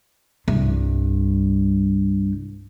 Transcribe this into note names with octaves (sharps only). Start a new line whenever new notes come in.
C2 G2